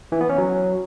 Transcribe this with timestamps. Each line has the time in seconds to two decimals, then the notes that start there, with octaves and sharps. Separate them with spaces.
0.12 E3
0.21 B3
0.29 C#4
0.38 F#3